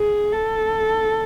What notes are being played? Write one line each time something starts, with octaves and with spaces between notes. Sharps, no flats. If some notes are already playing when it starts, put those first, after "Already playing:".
Already playing: G#4
A4